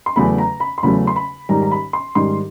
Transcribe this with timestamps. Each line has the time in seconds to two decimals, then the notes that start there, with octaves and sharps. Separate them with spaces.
0.06 C6
0.16 E2 C#3 F#3 A3 B5
0.38 A#5
0.60 B5
0.78 C6
0.83 E2 C#3 F#3 A3 B5
1.07 C6
1.16 B5
1.49 G#2 D#3 G3 A#5
1.62 A#5
1.71 B5
1.93 C6
2.15 G#2 D#3 G3 C6